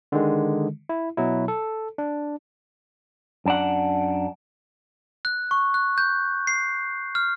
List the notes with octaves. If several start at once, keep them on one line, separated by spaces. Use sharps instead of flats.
D3 D#3 G#3
E4
B2 F#3 E4
A4
D4
F#2 D4 F#5
F#6
C#6
F#6
G6
C7
F6